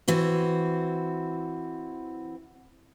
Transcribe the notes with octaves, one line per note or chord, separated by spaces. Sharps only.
E3 C4 F#4